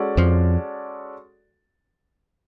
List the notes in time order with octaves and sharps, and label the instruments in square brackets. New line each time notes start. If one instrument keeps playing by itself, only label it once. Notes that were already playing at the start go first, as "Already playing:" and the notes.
Already playing: [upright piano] G#3 C#4 F#4 A4 D5
[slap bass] F2 F3